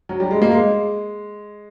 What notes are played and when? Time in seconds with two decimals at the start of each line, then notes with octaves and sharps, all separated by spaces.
0.09 F#3
0.20 G3
0.31 G#3
0.42 A#3
0.52 G#3